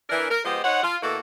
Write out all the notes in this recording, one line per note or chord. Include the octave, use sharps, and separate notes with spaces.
E3 D4 A#4
A#4
F3 G#3 B3 G4 C5 D#5
D#4 C5 C#5 F#5
F4
B2 A#3 E4 F#4 A4